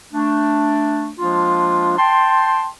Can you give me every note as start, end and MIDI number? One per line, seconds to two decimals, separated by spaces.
0.13 1.09 57
0.13 1.09 62
1.18 1.96 53
1.18 1.96 56
1.18 1.96 58
1.18 1.96 62
1.18 1.96 65
1.97 2.67 79
1.97 2.67 81
1.97 2.67 84